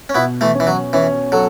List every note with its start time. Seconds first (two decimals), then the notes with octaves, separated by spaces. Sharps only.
0.09 C#4
0.15 B2 B3 E4
0.41 E3 A3
0.55 C#4
0.60 E3
0.67 F#3
0.93 E3 C#4
1.32 F#3 A4